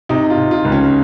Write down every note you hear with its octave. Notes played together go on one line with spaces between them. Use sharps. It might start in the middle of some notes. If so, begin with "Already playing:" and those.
C3 D#4
F4
C3
F4
C#2
C#4